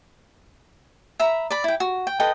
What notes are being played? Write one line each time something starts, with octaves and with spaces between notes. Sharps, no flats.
E5 A#5 B5
D5 B5
E4 G5
F#4
G5
A4 B4 D#5 G5